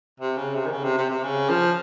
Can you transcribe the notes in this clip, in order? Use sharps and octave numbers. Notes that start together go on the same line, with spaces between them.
C3
C#3
C3
D#3
C#3
C3
C3
C3
C#3
F3